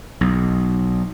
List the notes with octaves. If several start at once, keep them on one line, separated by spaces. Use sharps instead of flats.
B1